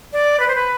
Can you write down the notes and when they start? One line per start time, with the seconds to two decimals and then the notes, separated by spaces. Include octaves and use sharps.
0.13 D5
0.40 B4
0.48 C5
0.55 B4